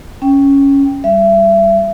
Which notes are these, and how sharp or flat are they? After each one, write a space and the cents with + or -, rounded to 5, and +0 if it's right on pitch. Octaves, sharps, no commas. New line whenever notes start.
C#4 +0 G5 +0
G3 +0 E5 +30